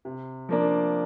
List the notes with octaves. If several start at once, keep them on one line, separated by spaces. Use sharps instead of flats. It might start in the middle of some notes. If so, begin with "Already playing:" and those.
C3
F3 A#3 D4